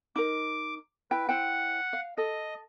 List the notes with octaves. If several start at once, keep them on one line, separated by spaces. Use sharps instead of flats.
D#4 A#4 D6
E4 B4 G5
E4 C5 F#5 G5
F5
A4 D#5